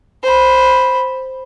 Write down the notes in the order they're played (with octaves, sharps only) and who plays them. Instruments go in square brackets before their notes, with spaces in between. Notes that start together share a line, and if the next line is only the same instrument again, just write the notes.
[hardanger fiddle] C5 B5